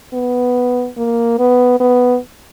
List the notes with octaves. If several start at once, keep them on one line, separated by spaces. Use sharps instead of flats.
B3
A#3
B3
B3